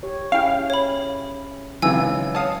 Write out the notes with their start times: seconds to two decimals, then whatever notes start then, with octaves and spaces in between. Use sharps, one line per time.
0.03 G4 C#5
0.32 C#4 E4 G#4 F5 G5
0.70 C#5 B5
1.82 G#1 C#2 E3 F#3 G#3 G#5 E6
2.35 C#5 F5 A5 D#6